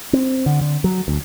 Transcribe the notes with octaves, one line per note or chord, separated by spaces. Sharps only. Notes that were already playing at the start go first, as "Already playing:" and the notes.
C4
D3
D3
F#3
D2